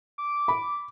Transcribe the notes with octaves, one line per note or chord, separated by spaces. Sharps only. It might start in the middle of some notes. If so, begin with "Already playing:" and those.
D6
B5